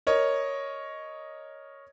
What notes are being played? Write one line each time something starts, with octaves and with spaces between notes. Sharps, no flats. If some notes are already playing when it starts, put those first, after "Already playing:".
A#4 C#5 D#5